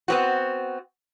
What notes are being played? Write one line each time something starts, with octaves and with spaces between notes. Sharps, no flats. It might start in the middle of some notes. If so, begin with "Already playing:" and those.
B3 C4 F#4